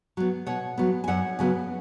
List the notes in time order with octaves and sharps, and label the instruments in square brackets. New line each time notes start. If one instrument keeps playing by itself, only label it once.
[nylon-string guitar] F#3 B3
B2 C#5 F#5
F#3 B3
G#5
F#2 C#5 F#5
C#3 F#3 B3